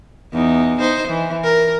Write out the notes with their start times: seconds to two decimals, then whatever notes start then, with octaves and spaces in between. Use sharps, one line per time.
0.33 E2 D#4
0.79 D#4 C5
1.08 E3
1.43 A#4